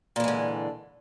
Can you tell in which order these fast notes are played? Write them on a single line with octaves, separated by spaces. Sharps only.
A#2 E3 G#3 D3